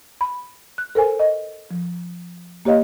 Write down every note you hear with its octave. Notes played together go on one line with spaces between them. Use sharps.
B5
F#6
A4 A#4 C5 G#5
D#5
F3
A#3 G4 C#5 D#5 F5